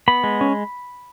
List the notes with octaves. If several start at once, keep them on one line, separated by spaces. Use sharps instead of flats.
B3 B5
G#3
C#4